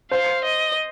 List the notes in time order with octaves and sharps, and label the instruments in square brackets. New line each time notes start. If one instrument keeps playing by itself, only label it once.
[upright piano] C5 [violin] F5
[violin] D#5